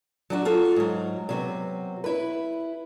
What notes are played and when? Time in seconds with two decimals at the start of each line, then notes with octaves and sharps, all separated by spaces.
0.30 F#3 D4 F#4
0.45 F4 F#4 A4
0.76 G#2 F#3
1.29 C3 F#3 B3
2.04 E4 B4